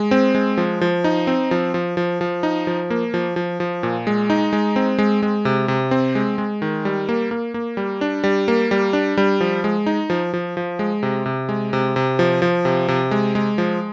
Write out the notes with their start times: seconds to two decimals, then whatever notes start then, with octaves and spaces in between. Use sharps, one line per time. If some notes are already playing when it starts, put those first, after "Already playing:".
Already playing: G#3
0.11 C4
0.35 G#3
0.57 F3
0.81 F3
1.04 D#4
1.27 C4
1.51 F3
1.74 F3
1.97 F3
2.21 F3
2.43 D#4
2.67 F3
2.90 A#3
3.14 F3
3.36 F3
3.60 F3
3.83 A#2
4.07 G#3
4.30 D#4
4.53 G#3
4.76 C4
4.98 G#3
5.23 G#3
5.45 C3
5.68 C3
5.91 C4
6.15 G#3
6.38 G#3
6.62 D#3
6.85 G3
7.09 A#3
7.31 A#3
7.54 A#3
7.77 G3
8.01 D4
8.24 G3
8.48 A#3
8.71 G3
8.93 D4
9.17 G3
9.41 F3
9.64 G#3
9.86 D#4
10.10 F3
10.34 F3
10.57 F3
10.79 G#3
11.03 C3
11.26 C3
11.49 G#3
11.73 C3
11.96 C3
12.19 F3
12.42 F3
12.65 C3
12.88 C3
13.11 G#3
13.35 G#3
13.58 F3